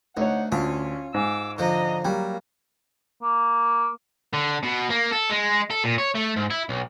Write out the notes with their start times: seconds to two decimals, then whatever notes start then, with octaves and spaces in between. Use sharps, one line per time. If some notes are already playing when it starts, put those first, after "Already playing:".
0.17 D2 D#4 C#5 F#5
0.52 D2 C#4 F4
1.14 G#2 D6 E6
1.58 D3 F3 D#5 A#5
2.05 F#3 G3 A#3
3.23 A#3
4.34 D3
4.63 B2
4.89 A#3
5.11 A4
5.30 G#3
5.71 A4
5.84 A#2
5.98 C#5
6.15 A3
6.36 G#2
6.50 E4
6.69 B1